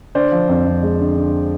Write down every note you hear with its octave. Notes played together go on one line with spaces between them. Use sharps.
D3 C5 D5
F3
F2
F2
G#3
D3
D3